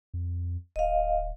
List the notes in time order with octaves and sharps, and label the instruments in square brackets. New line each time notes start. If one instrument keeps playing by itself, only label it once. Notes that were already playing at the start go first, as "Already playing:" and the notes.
[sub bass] F2
[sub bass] D1 [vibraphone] D#5 F5